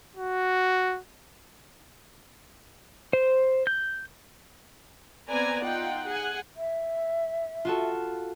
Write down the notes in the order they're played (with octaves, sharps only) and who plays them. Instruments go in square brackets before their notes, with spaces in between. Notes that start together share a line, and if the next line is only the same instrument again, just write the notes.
[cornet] F#4
[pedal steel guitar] C5
G6
[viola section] B3 C4 B4 D5 G#5 A#5
D#4 F4 F#5 G5
G#4 F#5 G#5
[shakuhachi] E5
[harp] F4 F#4 A4